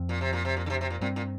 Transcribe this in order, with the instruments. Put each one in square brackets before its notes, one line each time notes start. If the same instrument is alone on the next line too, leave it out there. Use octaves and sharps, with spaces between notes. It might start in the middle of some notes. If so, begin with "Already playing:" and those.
Already playing: [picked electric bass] F2 F3 C4
[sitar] A#2
C3
A#2
C3
A#2
D3
C3
C3
A#2
[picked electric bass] G2 G3 C4 [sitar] A#2
[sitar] A#2